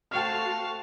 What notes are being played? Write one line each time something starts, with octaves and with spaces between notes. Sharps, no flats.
A3 F#4 C5 F5 G5 A5 C#6 F6